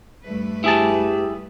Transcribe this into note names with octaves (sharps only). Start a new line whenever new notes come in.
G2 A3 B4
E4 G4 G#4 A5